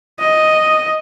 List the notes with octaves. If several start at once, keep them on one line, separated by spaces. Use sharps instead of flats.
D#5